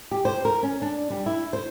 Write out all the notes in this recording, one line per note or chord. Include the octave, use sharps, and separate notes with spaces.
G4
C5
A#4
C#4
D4
G3
E4
C5